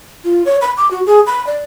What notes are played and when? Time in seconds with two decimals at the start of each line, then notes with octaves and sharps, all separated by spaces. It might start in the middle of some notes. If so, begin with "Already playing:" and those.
0.25 F4
0.46 C#5
0.61 B5
0.77 D6
0.91 F#4
1.07 G#4
1.27 B5
1.47 D5